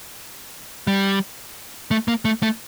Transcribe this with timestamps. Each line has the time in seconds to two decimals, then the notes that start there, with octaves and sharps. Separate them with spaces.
0.87 G3
1.91 A3
2.08 A#3
2.25 A3
2.43 A3